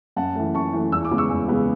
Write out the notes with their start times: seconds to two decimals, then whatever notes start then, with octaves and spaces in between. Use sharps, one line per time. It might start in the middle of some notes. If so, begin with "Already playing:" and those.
0.16 F#2 F#5 A5
0.36 E3 A3
0.54 F#2 A5 C#6
0.73 E3 A3
0.92 E2 E6
1.05 D6
1.11 C#3 G#3 B3
1.18 C#6 E6
1.30 E2
1.49 C#3 G#3 B3